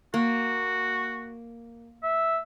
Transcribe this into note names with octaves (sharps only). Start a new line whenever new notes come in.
A#3 F#4
E5